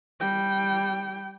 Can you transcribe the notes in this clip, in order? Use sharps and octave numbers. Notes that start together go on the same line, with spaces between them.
G3 G5